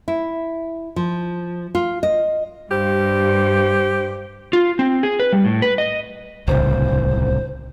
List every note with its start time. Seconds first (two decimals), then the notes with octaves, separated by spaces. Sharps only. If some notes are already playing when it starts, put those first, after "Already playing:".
0.08 E4
0.96 F3
1.75 F4
2.03 D#5
2.71 G2 G4 C5
4.53 F4
4.79 C4
5.03 G#4
5.19 B4
5.33 G3
5.44 A2
5.62 B4
5.78 D#5
6.48 D1 C2 C#3 C5